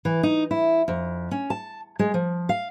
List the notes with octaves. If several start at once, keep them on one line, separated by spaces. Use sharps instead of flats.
E3
D#4
E4
F2
C#4
A5
G#3
F3
F5